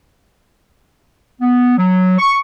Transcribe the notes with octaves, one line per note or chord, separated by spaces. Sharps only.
B3
F#3
C#6